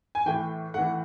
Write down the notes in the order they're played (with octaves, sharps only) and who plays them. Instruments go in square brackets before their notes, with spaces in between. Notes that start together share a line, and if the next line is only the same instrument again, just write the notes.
[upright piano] G#5
A2 E3 G5
A2 E3 F#5